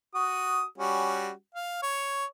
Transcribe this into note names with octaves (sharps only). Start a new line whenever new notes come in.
F#4 D#6
G3 C#4 F#4
F5
C#5